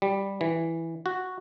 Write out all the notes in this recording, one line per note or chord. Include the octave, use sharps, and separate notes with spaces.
G3
E3
F#4